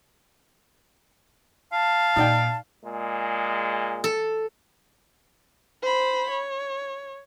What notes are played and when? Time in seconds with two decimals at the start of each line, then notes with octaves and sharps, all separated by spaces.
1.72 F5 A5
2.16 A#2 D#4 D5 G5
2.84 A#2 G#3
4.04 A4
5.83 C5 B5
6.30 C#5